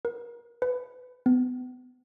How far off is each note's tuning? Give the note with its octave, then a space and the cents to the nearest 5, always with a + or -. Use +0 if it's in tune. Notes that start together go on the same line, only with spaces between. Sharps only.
A#4 +30
B4 +15
B3 +30